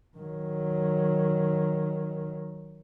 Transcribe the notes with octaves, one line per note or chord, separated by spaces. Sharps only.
D#3 F#3